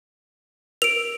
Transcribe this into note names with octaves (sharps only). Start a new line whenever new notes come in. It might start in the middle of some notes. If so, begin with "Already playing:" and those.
A#4 D7 F7